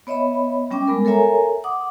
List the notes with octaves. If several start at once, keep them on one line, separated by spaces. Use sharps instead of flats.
B3 C#5 D#5 E5 B5
G3 C#4 G5 D6
G#3 B3 A#4
A4 A#4 C#5 E5 G#5 A#5
F#5 D6 D#6